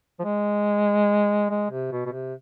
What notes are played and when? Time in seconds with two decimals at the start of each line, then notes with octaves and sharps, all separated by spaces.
0.19 F3
0.24 G#3
1.50 G#3
1.70 C3
1.92 B2
2.06 B2
2.12 C3